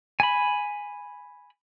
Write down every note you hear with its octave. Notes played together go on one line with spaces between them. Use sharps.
G#5 B5